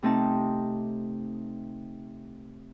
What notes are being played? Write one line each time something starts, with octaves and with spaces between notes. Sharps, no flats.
C3 A3 C4 D#4 A5